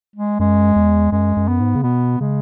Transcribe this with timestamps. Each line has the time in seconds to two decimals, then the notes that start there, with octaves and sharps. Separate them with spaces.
0.16 G#3
0.39 F#2 G#3
0.76 E2
1.12 F#2 G#3
1.36 F#2
1.48 B3
1.60 G#2
1.75 C#3
1.83 B2 B3
2.20 C#3 G#3